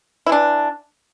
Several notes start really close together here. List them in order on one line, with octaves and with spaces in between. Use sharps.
E4 E3 D4